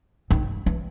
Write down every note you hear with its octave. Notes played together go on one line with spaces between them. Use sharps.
D#3
E3